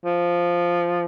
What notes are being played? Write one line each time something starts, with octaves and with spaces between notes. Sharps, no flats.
F3